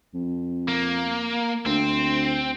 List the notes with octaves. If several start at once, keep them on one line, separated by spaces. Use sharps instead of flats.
F2
A#3
D2 C4